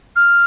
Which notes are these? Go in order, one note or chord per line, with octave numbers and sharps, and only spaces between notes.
F6